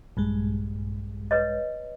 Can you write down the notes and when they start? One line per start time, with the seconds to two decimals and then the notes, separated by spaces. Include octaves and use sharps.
0.17 A#1 G2 G#3
1.31 B4 C#5 D#5